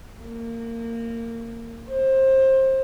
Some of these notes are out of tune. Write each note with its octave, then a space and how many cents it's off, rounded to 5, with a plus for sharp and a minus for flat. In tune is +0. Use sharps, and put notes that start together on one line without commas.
A#3 -20
C5 +25